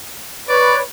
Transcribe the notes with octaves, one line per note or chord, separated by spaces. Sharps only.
B4 C#5 D5